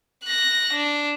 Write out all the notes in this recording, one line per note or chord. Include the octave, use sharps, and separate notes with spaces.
F#6 A#6
D4